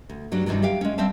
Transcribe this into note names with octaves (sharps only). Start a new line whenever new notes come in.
D2
G2 F#3 G3 D4
G2 C3 D#3 E3 F#3
G4 E5 F5 G5
G#3 C#4
G3 C4 C5 E5 F5 A5